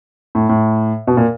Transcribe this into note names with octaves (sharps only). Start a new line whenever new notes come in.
A2
A2
B2
A#2